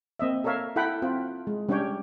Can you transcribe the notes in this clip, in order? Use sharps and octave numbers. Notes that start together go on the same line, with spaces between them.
A#3 C4 D#5 E5
A4 A#4 C#5 E5 F5
E4 A4 F#5 G5 B5
C4 F4 G5
G#3
G3 C#4 D4 G4 C#5 G5